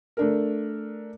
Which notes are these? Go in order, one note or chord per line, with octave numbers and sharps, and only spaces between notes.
A3 D4 A#4